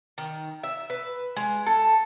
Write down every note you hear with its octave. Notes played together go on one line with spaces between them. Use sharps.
D#3
E5
B4
G#3
A4